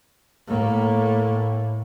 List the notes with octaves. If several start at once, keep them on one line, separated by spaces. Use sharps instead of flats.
A2 A#3